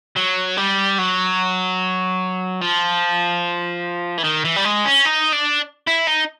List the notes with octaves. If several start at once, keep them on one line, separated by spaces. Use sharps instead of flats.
F#3
G3
F#3
F3
E3
D#3
E3
G3
G#3
C#4
D#4
D4
E4
D#4